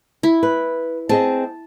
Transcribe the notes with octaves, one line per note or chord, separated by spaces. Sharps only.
E4
B4
C4 G#4 D#5 A5